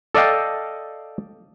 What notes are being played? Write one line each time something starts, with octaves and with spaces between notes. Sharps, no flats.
A4 D5 D#5 F5 G5